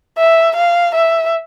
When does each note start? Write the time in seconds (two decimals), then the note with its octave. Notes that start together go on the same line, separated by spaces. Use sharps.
0.18 E5
0.56 F5
0.95 E5